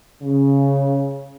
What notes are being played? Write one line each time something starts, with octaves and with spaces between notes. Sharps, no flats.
C#3